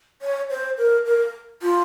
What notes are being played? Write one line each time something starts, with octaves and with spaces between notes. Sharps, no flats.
C#5
C5
A#4
A#4
F4